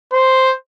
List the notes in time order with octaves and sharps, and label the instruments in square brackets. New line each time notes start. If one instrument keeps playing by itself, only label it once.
[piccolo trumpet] C5